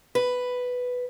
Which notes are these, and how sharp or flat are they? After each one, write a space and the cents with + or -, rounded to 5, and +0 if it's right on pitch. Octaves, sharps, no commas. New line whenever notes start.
B4 +5